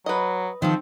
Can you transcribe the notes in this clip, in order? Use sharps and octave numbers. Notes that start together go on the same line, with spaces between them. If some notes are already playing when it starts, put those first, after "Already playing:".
F#3 B4 D#5
D#3 F3 C4 A4